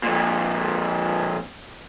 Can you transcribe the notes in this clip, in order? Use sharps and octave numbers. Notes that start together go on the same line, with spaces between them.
F2 A#2